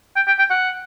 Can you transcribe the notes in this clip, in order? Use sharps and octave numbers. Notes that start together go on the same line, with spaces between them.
G5
G5
G5
F#5